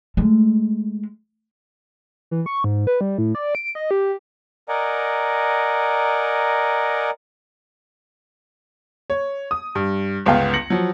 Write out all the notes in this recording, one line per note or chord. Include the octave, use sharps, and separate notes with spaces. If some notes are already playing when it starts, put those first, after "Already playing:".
G#3 A3
E3
C#6
G#2
B4
G3
A2
D5
D7
D#5
G4
A#4 D5 D#5 F#5 G#5 A#5
C#5
D#6
G2
G1 C#2 B3 F5 G5
A#6 C#7 F#7
F3 F#3